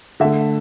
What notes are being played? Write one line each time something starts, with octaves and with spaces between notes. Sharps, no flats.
D3 A3 E5